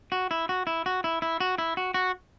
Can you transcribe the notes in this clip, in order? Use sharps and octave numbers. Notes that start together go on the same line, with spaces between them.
F#4
E4
F#4
E4
F#4
E4
E4
F#4
E4
F#4
F#4